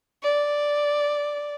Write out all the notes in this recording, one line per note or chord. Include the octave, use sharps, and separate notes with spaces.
D5